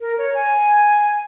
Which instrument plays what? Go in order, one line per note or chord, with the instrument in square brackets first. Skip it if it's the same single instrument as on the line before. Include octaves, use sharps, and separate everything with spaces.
[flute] A#4
C#5
G#5